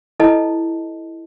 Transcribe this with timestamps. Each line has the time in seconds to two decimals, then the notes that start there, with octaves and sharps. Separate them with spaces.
0.20 E4 A4 B4 D#5 A5